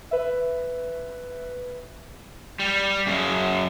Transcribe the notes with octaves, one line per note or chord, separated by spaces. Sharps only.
B4 E5
G3
F#2 C#3